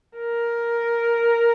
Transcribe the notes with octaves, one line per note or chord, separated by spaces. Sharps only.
A#4